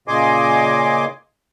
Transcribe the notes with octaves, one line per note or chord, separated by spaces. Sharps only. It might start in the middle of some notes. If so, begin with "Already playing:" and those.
A#2 C#3 D#5 G#5 C6 D6